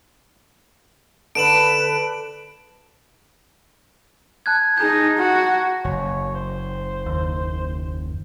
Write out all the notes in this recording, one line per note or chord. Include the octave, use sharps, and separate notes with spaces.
D3 B4 D7 E7 F#7
A5 F#6 G#6
D#4 G#4 A#5 G6
F#4
F#1 C#5
C5
D#2